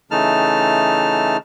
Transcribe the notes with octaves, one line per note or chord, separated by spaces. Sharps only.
C#3 E3 A3 D#4 A5 F6